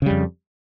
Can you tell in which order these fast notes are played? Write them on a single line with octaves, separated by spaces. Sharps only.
C#3 G3 F2